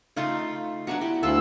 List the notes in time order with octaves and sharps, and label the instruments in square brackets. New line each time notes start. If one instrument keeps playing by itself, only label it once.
[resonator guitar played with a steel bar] C#3 A3 F4 [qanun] D#4 A#5
[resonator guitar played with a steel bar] F#3 D4 F#4 [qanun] B3 E5 A#5
[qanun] E4 [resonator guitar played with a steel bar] G4
[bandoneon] D2 E6 [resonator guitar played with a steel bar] F4 A4 [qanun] B4 F5 B5